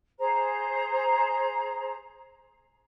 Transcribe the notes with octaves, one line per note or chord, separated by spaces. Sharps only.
G#4 C5 A#5